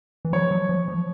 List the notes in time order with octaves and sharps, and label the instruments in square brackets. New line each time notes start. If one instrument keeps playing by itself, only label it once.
[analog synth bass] E3
[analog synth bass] F3 [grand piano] C#5
[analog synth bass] F#3
F3
F3